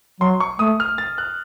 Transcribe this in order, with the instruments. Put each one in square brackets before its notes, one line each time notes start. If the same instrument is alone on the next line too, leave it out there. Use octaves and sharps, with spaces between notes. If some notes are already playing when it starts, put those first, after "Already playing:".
[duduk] F#3 [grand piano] C6
[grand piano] C#6
[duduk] A3 [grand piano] D#6
[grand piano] F6
A6
F#6